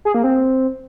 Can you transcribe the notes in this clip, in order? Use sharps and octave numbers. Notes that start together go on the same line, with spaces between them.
G#4
A#3
C4